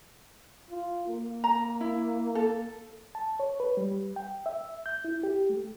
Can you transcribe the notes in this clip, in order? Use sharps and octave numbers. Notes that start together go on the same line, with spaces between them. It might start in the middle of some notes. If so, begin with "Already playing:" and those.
F4
A#3
A#5
E4
A4
A5
C#5
B4
G3
G5
E5
G6
E4
G4
A3